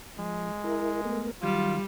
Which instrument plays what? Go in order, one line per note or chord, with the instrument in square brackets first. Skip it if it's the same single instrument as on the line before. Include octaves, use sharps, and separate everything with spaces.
[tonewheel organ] F3 [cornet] G#3
[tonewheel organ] E4 A#4
A3 B3 A#4
[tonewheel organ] D#3 F#3 [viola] G3 [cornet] F4